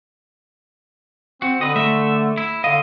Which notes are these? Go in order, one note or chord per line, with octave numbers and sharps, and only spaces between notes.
C4 F#4
D3 B4 D#5
A3 E5
E4
D3 D#5 F5